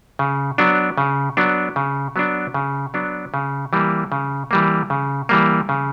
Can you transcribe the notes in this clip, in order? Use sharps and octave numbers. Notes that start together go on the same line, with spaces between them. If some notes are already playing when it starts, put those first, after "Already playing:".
C#3
F#3 B3 D4
C#3
F#3 B3 D4
C#3
F#3 B3 D4
C#3
F#3 B3 D4
C#3
E3 G3 A#3
C#3
E3 G3 A#3
C#3
E3 G3 A#3
C#3